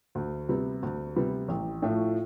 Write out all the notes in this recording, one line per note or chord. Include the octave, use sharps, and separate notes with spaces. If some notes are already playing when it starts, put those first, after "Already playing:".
D2
C3 G3 B3
D2
C3 G3 B3
A1
A2 F3 A3